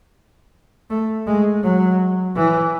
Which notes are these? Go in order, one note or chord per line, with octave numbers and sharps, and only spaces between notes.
A3
G#3
F#3
E3